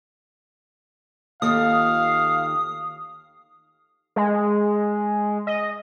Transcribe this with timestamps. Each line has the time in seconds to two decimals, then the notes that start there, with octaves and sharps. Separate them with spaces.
1.42 D#2 A3 F4 F5 D#6
4.16 G#3
5.47 D#5